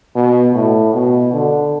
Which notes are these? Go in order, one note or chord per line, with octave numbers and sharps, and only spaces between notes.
B2
A2
B2
D3